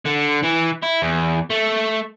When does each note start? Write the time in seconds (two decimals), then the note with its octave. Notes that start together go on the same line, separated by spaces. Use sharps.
0.05 D3
0.43 E3
0.83 E4
1.02 E2
1.50 A3